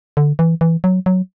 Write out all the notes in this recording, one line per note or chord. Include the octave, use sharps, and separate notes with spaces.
D3
E3
E3
F#3
F#3